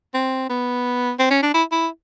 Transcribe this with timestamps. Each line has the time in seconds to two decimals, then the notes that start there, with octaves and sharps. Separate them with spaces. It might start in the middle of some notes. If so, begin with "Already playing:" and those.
0.14 C4
0.50 B3
1.19 C4
1.31 C#4
1.43 D4
1.54 E4
1.72 E4